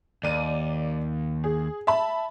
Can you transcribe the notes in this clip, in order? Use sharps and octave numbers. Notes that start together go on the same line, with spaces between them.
D#2 D5 D#7
G#4
E5 A5 B5